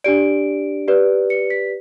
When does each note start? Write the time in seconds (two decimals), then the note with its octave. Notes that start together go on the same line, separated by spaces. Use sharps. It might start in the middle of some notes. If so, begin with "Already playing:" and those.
0.04 D4 G4 D5 D7
0.88 G4 B4 D5
1.30 C#7
1.50 B6